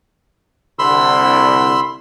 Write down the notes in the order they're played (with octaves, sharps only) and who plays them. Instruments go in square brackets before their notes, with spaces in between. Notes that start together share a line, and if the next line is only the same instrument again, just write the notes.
[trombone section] C2 D3 [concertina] B5 C6 E6